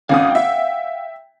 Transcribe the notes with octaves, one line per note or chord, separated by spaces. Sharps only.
G#1 C#4 F5 F#5 D#6
E5 G5